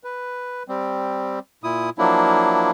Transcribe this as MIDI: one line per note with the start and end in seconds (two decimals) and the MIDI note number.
0.04 0.63 71
0.68 1.39 55
0.68 1.39 60
1.64 1.90 46
1.64 1.90 64
1.64 1.90 87
1.98 2.71 53
1.98 2.71 54
1.98 2.71 58
1.98 2.71 62
1.98 2.71 64